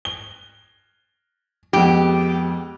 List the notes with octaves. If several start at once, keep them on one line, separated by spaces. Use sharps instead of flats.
G7
F2 G#3 B3 G4